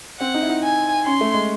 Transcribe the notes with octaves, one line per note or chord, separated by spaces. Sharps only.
C4 F#5
D#4
E4
D#4
G#5
C#4 C6
A3
G#3